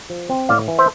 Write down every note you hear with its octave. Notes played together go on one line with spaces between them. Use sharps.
F3
C4
A2 D5 F5
E3
C5 E5